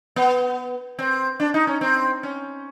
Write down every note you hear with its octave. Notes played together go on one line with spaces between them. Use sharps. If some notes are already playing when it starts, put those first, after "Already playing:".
B3
C4
D4
D#4
C#4
C4
C#4